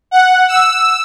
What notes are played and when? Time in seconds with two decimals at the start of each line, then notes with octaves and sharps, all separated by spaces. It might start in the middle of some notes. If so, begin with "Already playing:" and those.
0.11 F#5
0.48 E6